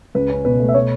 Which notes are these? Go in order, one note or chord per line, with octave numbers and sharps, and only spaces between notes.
C#2 B4
C#4
B2 B4
A3
E5
B2 C#5